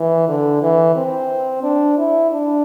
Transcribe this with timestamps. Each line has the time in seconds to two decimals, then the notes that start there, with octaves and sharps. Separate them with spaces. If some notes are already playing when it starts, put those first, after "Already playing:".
Already playing: E3
0.28 D3
0.62 E3
0.96 C4
1.63 D4
1.98 E4
2.31 D4